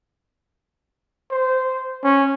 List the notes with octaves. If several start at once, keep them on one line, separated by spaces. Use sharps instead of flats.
C5
C#4